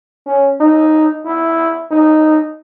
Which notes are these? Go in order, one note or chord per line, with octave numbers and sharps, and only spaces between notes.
C#4
D#4
E4
D#4